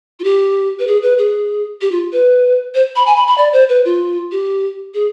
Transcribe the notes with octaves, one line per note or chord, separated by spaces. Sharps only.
F4
G4
B4
G#4
B4
G#4
G4
F4
B4
C5
B5
G#5
B5
B5
D5
C5
B4
F4
G4
G#4